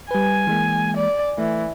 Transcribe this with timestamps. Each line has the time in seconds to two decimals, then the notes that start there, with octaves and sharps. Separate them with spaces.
0.11 G3 B4 G#5
0.47 E3 G#3 A#3
0.96 D5
1.38 E3 A3